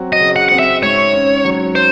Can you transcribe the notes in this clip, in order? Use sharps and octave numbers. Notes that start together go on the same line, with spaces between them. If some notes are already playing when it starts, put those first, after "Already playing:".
Already playing: F#3 C4 F#4
D#5
C#3
F#5
C4 F#5
E5
G#2 C#5
C#4
F#3
C5